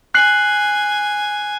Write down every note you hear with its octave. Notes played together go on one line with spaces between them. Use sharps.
G#5 F#6 C7 F#7